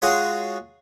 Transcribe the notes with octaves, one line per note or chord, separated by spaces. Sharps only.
G#3 F4 F#4 G#4 C#5